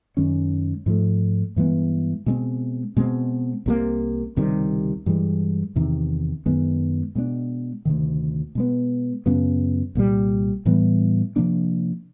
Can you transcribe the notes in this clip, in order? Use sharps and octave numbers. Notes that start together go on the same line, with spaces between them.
F#2 D#3 G#3 C#4
G#2 F3 A3
G2 E3 G#3 B3
B2 G#3 C4
B2 G#3 C4
C2 C3 F3 A#3
C#2 C3 D#3 G3
G2 E3 G#3
E2 C3 D#3
F#2 D#3 G#3 B3
B2 G#3 B3 D4
D2 C3 D#3
B2 G#3 B3
F#2 C#3 F#3 B3
C2 A#2 G3
A2 E3 G3 B3
C3 F3 A#3 D4